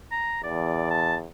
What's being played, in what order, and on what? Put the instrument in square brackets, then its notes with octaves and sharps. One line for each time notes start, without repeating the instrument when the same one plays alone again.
[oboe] A#5
[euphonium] E2 [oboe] D5
[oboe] A5